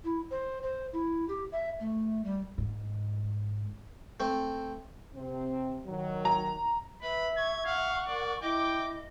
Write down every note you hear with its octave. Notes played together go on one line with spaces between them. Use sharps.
E4
C5
C5
E4
G4
E5
A3
G3
G#2
A3 C4
C3 C4
D#3 F#3
A#5
B4 E5 B5
C#6 G#6
F5 F#5
A#4 D5
E4 D#5 G5 D6